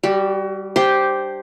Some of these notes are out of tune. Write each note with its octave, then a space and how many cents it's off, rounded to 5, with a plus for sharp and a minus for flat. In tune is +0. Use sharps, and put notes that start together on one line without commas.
G3 +0 F#4 +35
D4 +0 G4 -5 C5 +0